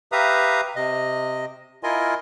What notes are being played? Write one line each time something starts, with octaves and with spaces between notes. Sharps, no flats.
G4 B4 E5 F5 A#5 D#6
C3 D#5
E4 F4 A#4 D#5 G#5 C6